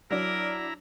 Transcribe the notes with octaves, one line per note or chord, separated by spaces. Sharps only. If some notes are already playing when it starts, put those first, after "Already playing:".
F#3 D4 E4 A#4 A#5